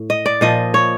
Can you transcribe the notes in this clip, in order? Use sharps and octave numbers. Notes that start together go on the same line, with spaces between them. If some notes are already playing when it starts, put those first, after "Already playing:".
Already playing: A2
D#5
D5
A#2 F3 D#5
C#5